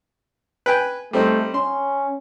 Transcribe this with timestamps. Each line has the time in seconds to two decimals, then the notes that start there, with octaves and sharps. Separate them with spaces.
0.66 B4 G5 G#5
1.13 G3 A3 C4 D#4
1.54 C#4 C6